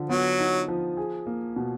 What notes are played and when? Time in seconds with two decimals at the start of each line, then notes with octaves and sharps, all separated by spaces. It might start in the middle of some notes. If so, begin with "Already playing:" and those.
Already playing: D3 F3
0.09 F#3 B3
0.39 D#4
0.68 F3
0.97 G#4
1.27 A#3
1.56 B2